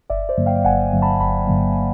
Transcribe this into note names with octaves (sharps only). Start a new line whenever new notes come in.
G1 D5 E5
C5 D5
G2 D3 F#3 A#3
F5 G5
G1 F#5 G#5
G2 D3 F#3 A#3
A5 B5
G1 A5 B5
G2 D3 F#3 A#3